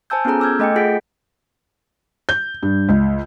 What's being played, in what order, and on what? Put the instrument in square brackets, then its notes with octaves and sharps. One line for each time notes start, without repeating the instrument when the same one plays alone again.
[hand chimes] C5 G#5 A5 E6 G6
B3 C#4 F4 G#4 A4 A#5
D6 E6 F6 G6 G#6
A3 A4 D#5 G5 G#5 C#7
F4 G#4 F#5 G6 B6 D7
[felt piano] G6
G2
C#2